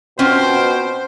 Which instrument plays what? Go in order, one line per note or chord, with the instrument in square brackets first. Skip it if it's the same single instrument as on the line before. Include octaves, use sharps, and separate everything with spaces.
[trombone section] B2 [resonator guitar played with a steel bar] C4 C#4 F4 [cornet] C5 [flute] G5